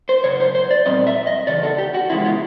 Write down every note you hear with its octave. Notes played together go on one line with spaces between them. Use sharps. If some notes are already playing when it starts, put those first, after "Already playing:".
C5
F#2 C#3 C#5
C5
C5
D5
A#2 G3 C4 D#5
E5
D#5
E2 C#3 D5
A4
G4
F#4
E2 C#3 F3 G#3 E4
F4